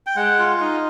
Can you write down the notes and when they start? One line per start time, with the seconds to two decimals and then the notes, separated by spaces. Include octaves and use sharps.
0.07 G5
0.16 G#3 F#5
0.38 F4
0.60 D#4